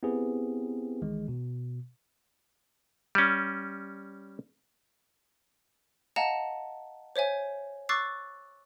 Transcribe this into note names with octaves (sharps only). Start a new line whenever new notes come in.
B3 C4 E4 G4 G#4 B4
B1 D#3 E3 G#3
B2
G3 C#4
D#5 F5 F#5 A5 A#5 E7
C5 C#5 E5 G#5
C#6 D6 E6 F#6 A6 C7